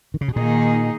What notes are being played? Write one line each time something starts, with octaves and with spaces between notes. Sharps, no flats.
D#3
C#3
B2
A#2 D#3 A#3 D#4 G#4